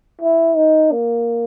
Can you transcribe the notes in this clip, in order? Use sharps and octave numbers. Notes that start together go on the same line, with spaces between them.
E4
D#4
A#3